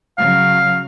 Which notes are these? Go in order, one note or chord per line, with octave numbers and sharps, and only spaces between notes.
C#3 F#3 F5